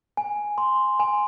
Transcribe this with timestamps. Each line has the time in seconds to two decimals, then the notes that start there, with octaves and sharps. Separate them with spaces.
0.17 G#5
0.58 C6
1.00 G#5